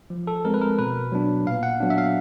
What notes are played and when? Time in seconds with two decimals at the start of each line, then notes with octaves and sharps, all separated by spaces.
0.10 F3
0.27 A4
0.45 G#3 C4 A#4
0.54 B4
0.61 A#4
0.78 B2 B4
1.12 F#3 B3 D4
1.46 A#2 F5
1.63 F#5
1.80 F#3 B3 D4
1.90 E5
1.98 F5